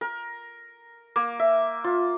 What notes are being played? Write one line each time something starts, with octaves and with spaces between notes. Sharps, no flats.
A#4
A#3
E5
F4